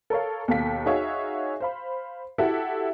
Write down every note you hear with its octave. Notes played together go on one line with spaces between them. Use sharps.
A4 A#4 C#5 F5
D#2 B2 A4 F5 B6
D#4 F#4 G#4 C#5 E5 F5
C5 F5 B5
E4 F#4 G4 A4 E5 F#5